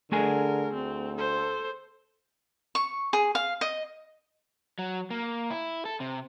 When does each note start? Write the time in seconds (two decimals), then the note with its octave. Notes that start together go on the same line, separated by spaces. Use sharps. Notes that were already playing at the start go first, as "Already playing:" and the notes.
0.12 D3 A3 G#4 A#4 G#5
0.74 D2 C4
1.17 A4 C5
2.75 C#6
3.13 G#4
3.35 F5
3.61 D#5
4.79 F#3
5.10 A#3
5.51 E4
5.85 A4
6.00 C3